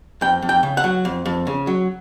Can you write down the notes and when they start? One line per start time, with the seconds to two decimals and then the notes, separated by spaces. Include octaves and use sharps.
0.21 F2 G5
0.42 F2
0.49 G5
0.63 C#3
0.77 F#5
0.84 F#3
1.05 F2
1.26 F2
1.47 C#3
1.67 F#3